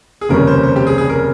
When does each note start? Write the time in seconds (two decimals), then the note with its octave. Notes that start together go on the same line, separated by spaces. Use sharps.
0.21 G#4
0.29 F1 D#2 C#3 G3 C#4 A#4
0.47 C5
0.63 C5
0.76 G4
0.87 G#4
0.98 G#4
1.09 A#4